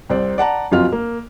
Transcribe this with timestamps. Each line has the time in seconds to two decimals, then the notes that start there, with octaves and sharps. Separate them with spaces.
0.10 C2 C4 D5
0.38 D5 F#5 A5 A#5
0.71 F#1 F2 F#3 F4 F6
0.92 A#3